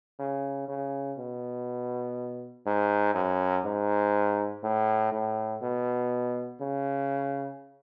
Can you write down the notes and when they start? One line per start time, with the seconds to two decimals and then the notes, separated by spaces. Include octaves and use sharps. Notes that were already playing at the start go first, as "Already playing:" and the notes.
0.19 C#3
0.68 C#3
1.18 B2
2.66 G#2
3.14 F#2
3.65 G#2
4.63 A2
5.12 A2
5.62 B2
6.61 C#3